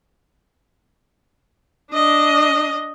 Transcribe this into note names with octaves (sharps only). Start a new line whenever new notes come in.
D4 D#5